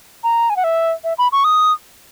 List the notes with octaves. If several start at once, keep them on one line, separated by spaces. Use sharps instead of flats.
A#5
G#5
F#5
E5
E5
B5
C#6
D#6